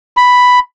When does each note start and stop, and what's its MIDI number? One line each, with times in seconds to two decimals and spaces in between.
0.17 0.59 83